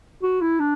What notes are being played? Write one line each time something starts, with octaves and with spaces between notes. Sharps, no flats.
F#4
E4
D4